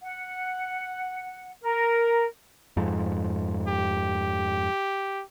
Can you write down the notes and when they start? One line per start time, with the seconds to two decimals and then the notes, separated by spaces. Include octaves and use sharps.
0.02 F#5
1.62 A#4
2.77 F2 G#2
3.68 G4